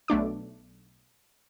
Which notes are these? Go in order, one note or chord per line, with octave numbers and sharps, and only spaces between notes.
B1 A3 D4 D6